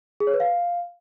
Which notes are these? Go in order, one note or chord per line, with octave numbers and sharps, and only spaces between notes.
G#4
C#5
B4
F5